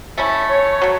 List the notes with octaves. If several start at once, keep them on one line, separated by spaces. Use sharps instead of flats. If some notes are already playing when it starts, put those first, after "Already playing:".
A3 C#4 E4
C#5
F#3 A3